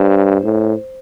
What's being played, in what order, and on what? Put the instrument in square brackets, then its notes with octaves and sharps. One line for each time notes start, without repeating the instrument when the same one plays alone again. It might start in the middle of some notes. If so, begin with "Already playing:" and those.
Already playing: [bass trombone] G2 [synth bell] C5
[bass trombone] A2